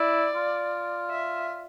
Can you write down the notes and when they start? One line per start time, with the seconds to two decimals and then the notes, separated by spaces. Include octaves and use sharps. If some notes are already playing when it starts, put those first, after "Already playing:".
Already playing: E4 D5
0.35 F4
1.11 E5